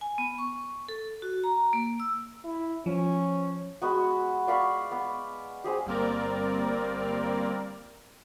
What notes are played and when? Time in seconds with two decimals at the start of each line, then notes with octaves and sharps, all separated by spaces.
0.01 G#5
0.18 B3
0.38 C#6
0.89 A4
1.22 F#4
1.44 A#5
1.73 A#3
2.00 E6
2.44 E4
2.86 F3 C#4
3.82 G#3 B3 F#4
4.47 D5 F5 B5 C#6
4.91 B3
5.64 G4 G#4 C5
5.86 G1 G3 A#3 C4 A#4 D5